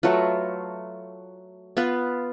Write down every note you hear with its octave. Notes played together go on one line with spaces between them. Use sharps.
F#3 A3 F4 B4
B3 F4 B4